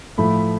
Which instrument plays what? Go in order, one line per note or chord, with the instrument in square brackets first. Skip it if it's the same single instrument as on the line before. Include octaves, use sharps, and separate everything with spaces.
[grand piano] A2 F3 A3 B5